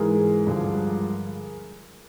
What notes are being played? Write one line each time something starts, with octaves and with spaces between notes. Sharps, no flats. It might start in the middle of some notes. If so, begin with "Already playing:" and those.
Already playing: G#2 E3 G#3 G#4 A#4
G2 D3 F3 G#3